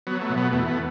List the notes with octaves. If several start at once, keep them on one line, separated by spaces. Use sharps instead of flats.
F#3 B3
A3
B2
B3
E2 A3
B3